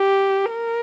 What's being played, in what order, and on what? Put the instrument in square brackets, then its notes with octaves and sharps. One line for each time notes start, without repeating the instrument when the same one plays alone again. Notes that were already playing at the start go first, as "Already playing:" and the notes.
Already playing: [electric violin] G4
A#4